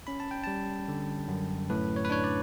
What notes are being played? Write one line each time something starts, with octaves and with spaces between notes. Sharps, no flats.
C#4 B5
A5
G5
G3 A5
D3
F#2
A2 B4
C#5
B4
D4 C#5
D5